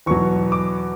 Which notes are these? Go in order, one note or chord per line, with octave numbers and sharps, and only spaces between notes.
E2 B2 F#3 C#6
D6